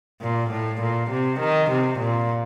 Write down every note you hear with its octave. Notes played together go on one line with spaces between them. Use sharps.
A#2
A2
A#2
C3
D#3
C3
A#2